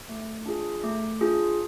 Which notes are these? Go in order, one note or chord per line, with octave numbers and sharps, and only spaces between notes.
A3
D4 F4 G#4
A3
D4 F4 G#4